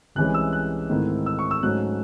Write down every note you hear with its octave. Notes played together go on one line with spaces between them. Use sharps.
C2 C3 E3 G#3 C#4 F#6
E6
F#6
G#2 D#3 A3 C4 E4
E6
C#6
E6
G#2 F#3 A3 C#4 F#6